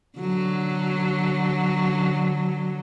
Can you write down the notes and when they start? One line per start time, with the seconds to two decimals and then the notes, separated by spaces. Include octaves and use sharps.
0.19 D3 F#3